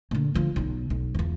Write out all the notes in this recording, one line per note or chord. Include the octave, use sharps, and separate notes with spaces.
A#2 D3
D3 F3
B1 B2
B1
E2 F3